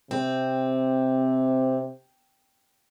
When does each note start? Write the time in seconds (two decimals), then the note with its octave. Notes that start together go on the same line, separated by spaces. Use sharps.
0.11 C3 C4